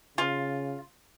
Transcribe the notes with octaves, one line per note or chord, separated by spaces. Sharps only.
C#3 F4